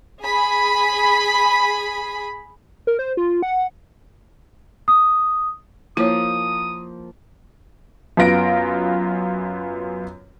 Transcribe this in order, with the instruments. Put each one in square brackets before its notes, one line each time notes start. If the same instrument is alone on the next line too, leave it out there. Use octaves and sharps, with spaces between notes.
[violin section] G#4 B5
[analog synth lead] A#4
C5
F4
F#5
[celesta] D#6
[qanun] F3 A#3 [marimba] E4 C#5 [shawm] D#6
[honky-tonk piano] F#2 B3 F4 A#6 D7